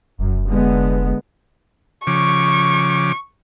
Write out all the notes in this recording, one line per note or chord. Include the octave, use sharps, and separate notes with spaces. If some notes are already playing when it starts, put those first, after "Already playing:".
F1 F#2
D3 G#3 B3
C#3 F3 C#6 D6